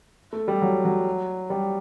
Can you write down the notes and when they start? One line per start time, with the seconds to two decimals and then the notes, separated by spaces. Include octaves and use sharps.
0.33 A3
0.48 G3
0.62 F#3
0.85 F#3
1.50 G3